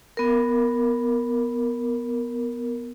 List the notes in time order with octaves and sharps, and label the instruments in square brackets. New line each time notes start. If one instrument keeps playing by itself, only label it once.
[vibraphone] B3 A#4